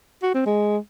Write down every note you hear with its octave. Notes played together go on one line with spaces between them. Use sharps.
F#4
C4
G#3